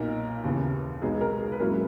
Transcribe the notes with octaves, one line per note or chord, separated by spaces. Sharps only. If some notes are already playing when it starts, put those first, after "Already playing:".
Already playing: B1 A#2 A#3 D#4 A#4
D#2 C#3 E3 B3
B1 B2 G#3 B3 D#4 G#4
G#4
A#4
G#4
B4
G#2 F#3 A#3 C#4 E4 A#4